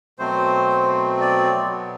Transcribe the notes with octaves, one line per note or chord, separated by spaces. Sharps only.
B2 F#3 A3 C4 C5
D5
B2 F#3 B3